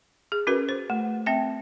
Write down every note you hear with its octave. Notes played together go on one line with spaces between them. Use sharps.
G#4
C#4 F#4 A#4 B4
C5
A3
C4 E5 G5